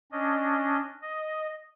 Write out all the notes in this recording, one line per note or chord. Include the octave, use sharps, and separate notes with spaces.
C#4 D4 D#5
D#5